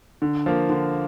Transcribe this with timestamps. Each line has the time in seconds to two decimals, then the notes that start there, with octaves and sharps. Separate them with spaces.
0.22 D3
0.46 F3 A#3
0.69 D3